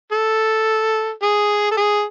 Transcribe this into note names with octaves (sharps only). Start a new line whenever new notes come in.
A4
G#4
A4
G#4